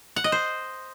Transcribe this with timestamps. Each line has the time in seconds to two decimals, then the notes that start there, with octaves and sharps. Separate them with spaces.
0.16 F#5
0.24 D#5
0.32 C5